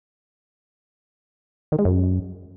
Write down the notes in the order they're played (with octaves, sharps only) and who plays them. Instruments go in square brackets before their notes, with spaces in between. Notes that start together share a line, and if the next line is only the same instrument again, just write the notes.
[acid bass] D#3
G#3
F#2